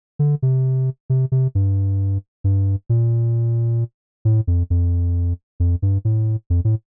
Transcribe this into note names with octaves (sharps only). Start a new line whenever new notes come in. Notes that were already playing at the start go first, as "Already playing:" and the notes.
D3
C3
C3
C3
G2
G2
A#2
A2
F2
F2
F2
G2
A2
F2
A2